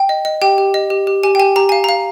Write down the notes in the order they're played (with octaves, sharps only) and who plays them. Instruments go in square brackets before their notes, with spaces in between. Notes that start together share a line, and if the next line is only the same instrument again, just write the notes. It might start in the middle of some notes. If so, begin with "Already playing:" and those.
Already playing: [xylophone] G5
D#5
D#5
G4 G5
G4
D#5
G4
G4
G4 G#5
G5
G4 G#5
G4 A#5
F5 G#5
A#5
F5